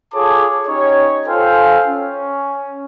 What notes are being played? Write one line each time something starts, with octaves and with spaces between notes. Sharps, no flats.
F4 G#4 A4 C#5 A5 D6
C#4 D#4 G4 C#5
F4 A4 C5 F5 G5 G#5
C#4